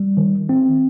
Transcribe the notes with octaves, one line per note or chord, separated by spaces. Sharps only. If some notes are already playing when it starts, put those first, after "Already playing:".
Already playing: G3
D#3
C4